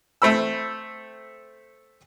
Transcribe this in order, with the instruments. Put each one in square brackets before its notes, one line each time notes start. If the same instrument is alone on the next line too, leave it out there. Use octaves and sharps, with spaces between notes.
[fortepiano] A3 C4 B5 E6